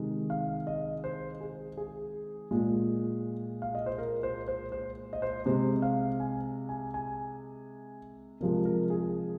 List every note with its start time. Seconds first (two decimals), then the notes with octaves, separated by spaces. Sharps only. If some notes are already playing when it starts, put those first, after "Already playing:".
Already playing: C3 D#3 G#3
0.30 F5
0.67 D#5
1.04 C5
1.41 G#4
1.77 G#4
2.51 A#2 G#3
3.62 F5
3.75 D#5
3.86 C5
3.98 A#4
4.23 C5
4.48 C5
4.72 C5
5.13 D#5
5.22 C5
5.46 C3 G#3 C5
5.82 F5
6.20 G#5
6.69 G#5
6.94 G#5
8.41 C3 F3 G#3 A#4
8.65 A#4
8.90 G#4